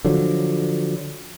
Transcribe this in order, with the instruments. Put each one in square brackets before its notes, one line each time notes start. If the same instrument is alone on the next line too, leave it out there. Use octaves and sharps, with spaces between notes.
[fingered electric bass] D3 F3 F#3